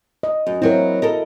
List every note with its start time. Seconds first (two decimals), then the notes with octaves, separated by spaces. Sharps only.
0.23 D#5
0.47 F#2
0.62 F#3 C4 E4 F#4 A#4
1.02 A4 A#4 D#5